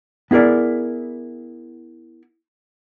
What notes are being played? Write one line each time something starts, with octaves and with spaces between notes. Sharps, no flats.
B3 E4 G#4 A#4 D5